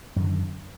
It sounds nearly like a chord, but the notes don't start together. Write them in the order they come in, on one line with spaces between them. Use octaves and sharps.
F#2 D#3 D3